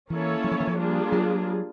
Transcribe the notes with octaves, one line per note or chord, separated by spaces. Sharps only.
E3 A#3 C#4 E4 A4 C#5
F#3
F3
E3
F3
G3 A#3 D4 F4 G#4
F#3